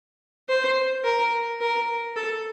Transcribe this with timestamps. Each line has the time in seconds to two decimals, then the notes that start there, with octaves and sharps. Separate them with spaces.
0.49 C5
1.05 A#4
1.61 A#4
2.16 A4